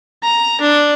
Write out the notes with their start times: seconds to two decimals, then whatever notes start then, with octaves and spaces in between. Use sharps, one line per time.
0.23 A#5
0.61 D4